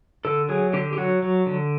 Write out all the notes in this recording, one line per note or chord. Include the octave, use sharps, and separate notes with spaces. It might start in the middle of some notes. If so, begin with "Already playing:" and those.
D3 A4
F#3 G#4
D3 G4
G4
F#3 F#4
F#3
D3